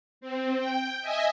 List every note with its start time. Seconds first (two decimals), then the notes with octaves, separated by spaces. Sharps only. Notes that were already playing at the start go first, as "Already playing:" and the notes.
0.21 C4
0.59 G5
1.01 D#5 E5 G#5